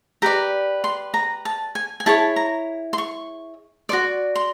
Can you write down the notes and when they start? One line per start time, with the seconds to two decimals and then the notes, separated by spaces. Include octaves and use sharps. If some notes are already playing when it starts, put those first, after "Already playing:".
0.22 G4 B4 D5 A#5
0.84 C6
1.14 A#5
1.45 A5
1.75 G#5
2.00 G#5
2.06 E4 G#4 C#5 A5
2.36 A#5
2.93 C6
2.98 C#6
3.89 F#4 A4 D5 C6
4.35 C6